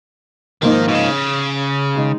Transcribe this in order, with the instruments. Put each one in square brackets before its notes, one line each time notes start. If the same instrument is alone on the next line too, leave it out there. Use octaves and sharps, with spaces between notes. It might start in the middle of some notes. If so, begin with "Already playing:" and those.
[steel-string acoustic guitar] G#2 F3 A#3 D#4 [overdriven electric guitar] D#3
[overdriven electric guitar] B2
C#3
[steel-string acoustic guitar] D#3 G#3 D#4